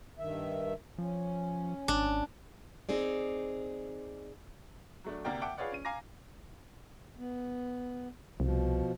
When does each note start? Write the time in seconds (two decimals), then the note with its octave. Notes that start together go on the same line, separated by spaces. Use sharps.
0.19 G2 D#3 E5
0.98 F3 C#4
1.88 G#1 D4
2.89 C4 D#4 G#4 D5
5.04 F#3 A3 D4
5.25 D2 C3 A#3 A#4 D5 G5
5.41 E5 F#5 G5 A5 D6 D7
5.58 F4 G#4 B4 C#5 D5 F#5
5.72 C#4 D#7
5.85 F5 G#5 A#5 D6 A#6
7.18 B3
8.40 C2 B2 F3